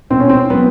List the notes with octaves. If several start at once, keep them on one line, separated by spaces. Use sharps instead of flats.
B2 C4
C#4
C4
F#3 B3